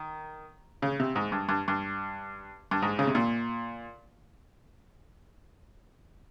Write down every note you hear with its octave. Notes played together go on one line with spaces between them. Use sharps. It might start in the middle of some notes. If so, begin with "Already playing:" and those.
Already playing: D#3
C#3
C3
G#2
G2
G2
G2
G2
G#2
C#3
C3
A#2